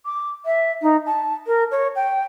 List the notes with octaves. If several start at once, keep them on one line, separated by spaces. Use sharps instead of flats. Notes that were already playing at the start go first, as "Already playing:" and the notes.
D6
E5
D#4
A5
A#4
C#5
G5